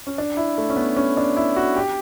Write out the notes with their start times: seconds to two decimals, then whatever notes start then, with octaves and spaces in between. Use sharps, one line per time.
0.07 C#4
0.18 D4
0.37 E4
0.58 A3
0.70 C#4
0.76 B3
0.97 C#4
1.17 D4
1.37 E4
1.56 F#4
1.76 G4